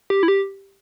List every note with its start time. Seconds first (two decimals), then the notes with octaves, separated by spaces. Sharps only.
0.10 G4
0.23 E4
0.28 G4